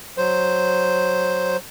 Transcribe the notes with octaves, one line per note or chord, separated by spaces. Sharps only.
F#3 C5